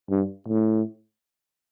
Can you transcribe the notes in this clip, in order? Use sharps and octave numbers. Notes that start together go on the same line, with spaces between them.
G2
A2